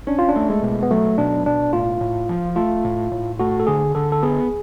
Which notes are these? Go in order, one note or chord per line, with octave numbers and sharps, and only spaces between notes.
C#4 D4
F4
D4
A3
G#3
B2
B3
F#3 A3
B2 D4
B2 D4
A2 F4
A2
F3
A3 F4
A2
A2
A3 F#4
A4
D3 G#4
D3 A4
A4
B3 G#4